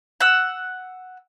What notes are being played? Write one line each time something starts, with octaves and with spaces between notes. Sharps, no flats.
F#5 E6